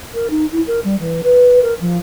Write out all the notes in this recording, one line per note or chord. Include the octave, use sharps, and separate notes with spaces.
A#4
D#4
E4
A#4
G3
E3
B4
A#4
F3